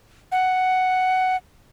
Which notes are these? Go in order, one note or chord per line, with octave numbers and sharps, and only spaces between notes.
F#5